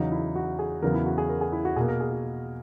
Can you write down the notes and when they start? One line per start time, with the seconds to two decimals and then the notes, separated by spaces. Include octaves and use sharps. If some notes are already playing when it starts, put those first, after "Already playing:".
Already playing: E2 C#3 F#3 D#4
0.12 E4
0.36 F#4
0.59 G#4
0.82 E2 C#3 F#3 B3 A#4
0.94 E4
1.06 F#4
1.18 G#4
1.29 A#4
1.41 G#4
1.52 E4
1.65 F#4
1.76 B2 A#3 G#4
1.88 A#4
2.01 G#4
2.11 F#4